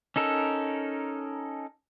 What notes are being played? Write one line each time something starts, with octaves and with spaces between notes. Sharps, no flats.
C#4 D#4 A4 A#4